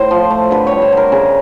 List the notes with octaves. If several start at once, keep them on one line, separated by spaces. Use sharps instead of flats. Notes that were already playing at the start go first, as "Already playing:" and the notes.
Already playing: A2 C5
F3
A3
D3 B4
G3 C#5
C5
D3 A#4
C#3 G#4